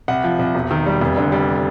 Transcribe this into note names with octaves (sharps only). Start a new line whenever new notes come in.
C2 F#5
F3
C2
E1
D#3
G3
F1
D3
G3